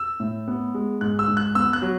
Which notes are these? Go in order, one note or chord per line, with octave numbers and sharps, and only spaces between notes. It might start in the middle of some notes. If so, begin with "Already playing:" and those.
Already playing: E6
A2
B3
G#3
G#2 F#6
E6
G#2
F#6
B3 E6
F#6
F#3